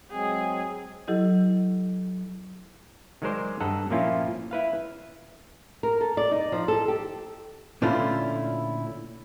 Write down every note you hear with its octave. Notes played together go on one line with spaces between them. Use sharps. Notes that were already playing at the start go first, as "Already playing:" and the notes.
F#3 G#3 C4 G#4
F#3 E4 G4 A4 D#5
D#3 F#3 G#3 A#4 C5 D5
G2 A4 D#5 F#5 A#5
A#2 F3 A#3 C#4 E4 F4
E4 B4 F5
A#4
A4
D5
D#4
F3
A4
G4
A#2 D3 A3 C#4 E4 F4